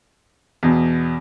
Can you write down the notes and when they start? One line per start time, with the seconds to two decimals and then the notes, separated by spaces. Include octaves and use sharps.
0.63 E2 B2